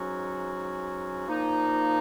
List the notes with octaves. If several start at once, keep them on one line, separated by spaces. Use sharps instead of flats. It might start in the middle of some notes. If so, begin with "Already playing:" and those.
Already playing: G#2 F#3 C#4 F#4
A#2 F3 A#3 D#4